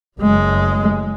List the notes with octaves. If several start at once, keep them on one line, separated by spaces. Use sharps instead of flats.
F#1 G#3